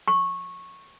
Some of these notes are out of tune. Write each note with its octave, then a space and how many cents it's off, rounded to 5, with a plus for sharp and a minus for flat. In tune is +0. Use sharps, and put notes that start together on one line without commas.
C#6 -15